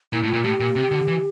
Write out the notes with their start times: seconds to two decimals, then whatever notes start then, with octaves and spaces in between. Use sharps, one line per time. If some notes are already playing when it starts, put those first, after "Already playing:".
0.13 A#2 E4
0.23 A2
0.28 F4
0.33 A#2
0.44 A2 G4
0.60 A#2
0.76 C3
0.91 D3
1.07 E3